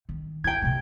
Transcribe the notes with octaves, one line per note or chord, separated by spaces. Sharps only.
D#3
E4 G5 G#6
C3 A3